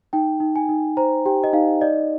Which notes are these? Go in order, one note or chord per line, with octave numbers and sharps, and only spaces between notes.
D#4 G5
D#4
G#5
D#4
C5 A#5
G4 G5
D#5
D#4 F5
D5 D#5